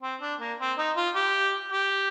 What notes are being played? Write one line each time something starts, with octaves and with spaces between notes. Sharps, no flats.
C4
D4
A#3
C4
D#4
F4
G4
G4